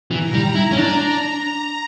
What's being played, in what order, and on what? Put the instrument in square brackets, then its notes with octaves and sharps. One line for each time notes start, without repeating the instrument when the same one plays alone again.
[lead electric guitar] E3 [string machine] A#5
[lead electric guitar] G3
E4
C#4
D4
[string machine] A#5